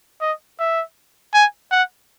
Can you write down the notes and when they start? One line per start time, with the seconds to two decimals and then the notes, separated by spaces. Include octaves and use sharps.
0.21 D#5
0.59 E5
1.34 G#5
1.71 F#5